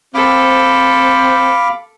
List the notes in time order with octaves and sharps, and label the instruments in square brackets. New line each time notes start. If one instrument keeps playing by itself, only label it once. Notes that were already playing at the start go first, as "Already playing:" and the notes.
[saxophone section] C4 [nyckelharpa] A4 [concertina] F5 B5 D6